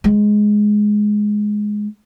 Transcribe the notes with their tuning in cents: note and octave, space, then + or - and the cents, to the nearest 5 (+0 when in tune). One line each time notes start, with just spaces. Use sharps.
G#3 +10